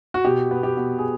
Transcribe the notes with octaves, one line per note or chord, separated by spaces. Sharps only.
F#4
B2 G4
B3
G4
B2
G#4